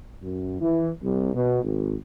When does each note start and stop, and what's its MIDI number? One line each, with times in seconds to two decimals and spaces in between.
0.22 0.59 42
0.61 0.89 52
1.03 1.31 36
1.34 1.61 47
1.63 1.94 32